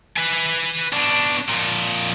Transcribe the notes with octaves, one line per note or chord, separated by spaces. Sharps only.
B4 G#5
B2 D4
F2 A#2